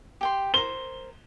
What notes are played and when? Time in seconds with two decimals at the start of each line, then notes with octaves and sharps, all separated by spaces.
0.21 G4 G5 C6
0.54 A#4 C5 G7